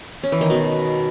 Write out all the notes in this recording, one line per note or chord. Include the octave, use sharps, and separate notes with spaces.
C#4
E3
D#3
B2